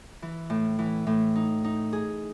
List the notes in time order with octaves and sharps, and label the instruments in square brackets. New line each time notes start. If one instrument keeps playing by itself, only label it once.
[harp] E3
A2
E3
A2
D#4
D#4
G#4